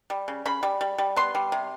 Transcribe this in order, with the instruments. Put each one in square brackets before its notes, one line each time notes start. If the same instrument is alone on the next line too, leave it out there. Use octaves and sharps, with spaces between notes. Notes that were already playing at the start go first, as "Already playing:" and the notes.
[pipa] G3
C#3
C#3 B5
G3
G3
G3
B3 C6
G3
C3